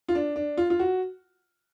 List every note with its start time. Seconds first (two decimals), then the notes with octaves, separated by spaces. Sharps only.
0.09 F4
0.15 D4
0.36 D4
0.58 F4
0.70 F4
0.79 F#4